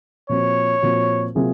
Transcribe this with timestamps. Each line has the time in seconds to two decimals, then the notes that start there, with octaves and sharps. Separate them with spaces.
0.29 A#2 F3 C4 F#4 C#5
0.82 A#2 F3 C4 F#4
1.35 C3 F#3 A#3 F4 G#4